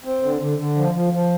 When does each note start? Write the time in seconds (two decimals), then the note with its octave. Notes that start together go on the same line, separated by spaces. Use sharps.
0.04 C4
0.22 D3
0.40 D3
0.58 D3
0.77 F3
0.94 F3
1.13 F3